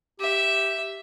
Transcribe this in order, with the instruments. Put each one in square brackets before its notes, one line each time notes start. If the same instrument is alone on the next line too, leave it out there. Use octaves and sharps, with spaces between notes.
[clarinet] G4 [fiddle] E5